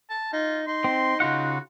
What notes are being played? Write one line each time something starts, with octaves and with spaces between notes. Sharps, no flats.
A5
D#4 F4
D#4 C6
C4
C#3 F4 F#4 F#5